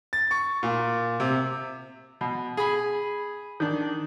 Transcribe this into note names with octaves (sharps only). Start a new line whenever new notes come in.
A6
C#6
A#2
C3
B2
G#4 B5
D#3 D4